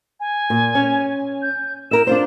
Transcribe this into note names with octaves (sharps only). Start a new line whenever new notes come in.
G#5
A#2
C#4
G6
E4 A#4 E5 E7
D4 F4 C5